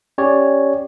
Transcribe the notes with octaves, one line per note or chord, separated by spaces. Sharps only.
C#4 G4 C#5 D5